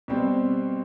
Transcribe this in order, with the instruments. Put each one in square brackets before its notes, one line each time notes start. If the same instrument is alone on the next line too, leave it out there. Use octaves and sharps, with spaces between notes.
[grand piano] B2 G3 C4